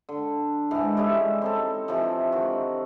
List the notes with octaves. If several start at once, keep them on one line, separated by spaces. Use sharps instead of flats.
D3
G#2 E3
G3 G#3 C#4 E4
C4 D#4 A4
C3 E3 F3
D#3 F#4